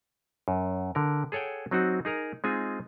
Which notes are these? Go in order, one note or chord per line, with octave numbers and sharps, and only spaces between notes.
F#2
D3 A#4
G#4 A4 C#5 F#5 G5
F#3 C4 D#4 F#4
D#4 G#4 A#4 A#5
G#3 C4 D#4 F4 G#4 G#5